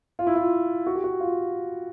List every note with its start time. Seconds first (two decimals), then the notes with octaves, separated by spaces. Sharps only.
0.19 F4
0.27 E4
0.36 F4
0.87 F#4
0.95 G4
1.04 F#4
1.20 F4